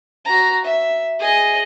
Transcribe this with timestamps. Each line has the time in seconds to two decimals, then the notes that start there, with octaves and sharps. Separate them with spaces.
0.25 F#4 A#5
0.65 E5
1.19 G#4 D#5